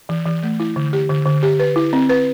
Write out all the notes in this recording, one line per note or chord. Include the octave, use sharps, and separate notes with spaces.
E3
E3
A3
E4
D3
G4
D3
D3
G4
B4
E4
C4
B4